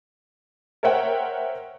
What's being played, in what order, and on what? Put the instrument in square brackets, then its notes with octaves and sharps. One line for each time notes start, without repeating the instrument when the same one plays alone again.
[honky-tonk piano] A#4 C5 C#5 E5 F#5 G5